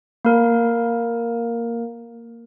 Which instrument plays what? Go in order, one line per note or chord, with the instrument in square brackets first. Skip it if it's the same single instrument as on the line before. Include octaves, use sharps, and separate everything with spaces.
[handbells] A#3 A#4